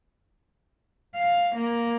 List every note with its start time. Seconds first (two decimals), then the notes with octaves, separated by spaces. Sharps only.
1.15 F5
1.55 A#3